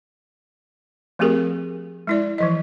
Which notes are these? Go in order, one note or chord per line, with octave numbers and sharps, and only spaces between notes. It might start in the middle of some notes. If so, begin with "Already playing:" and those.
F3 A3 C4 G4 G#4 A#4
G#3 E4 D5
E3 F3 D#5